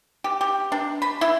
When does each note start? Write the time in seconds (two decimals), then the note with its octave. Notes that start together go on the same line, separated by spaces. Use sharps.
0.24 G4
0.41 G4
0.72 D4
1.02 B5
1.21 E4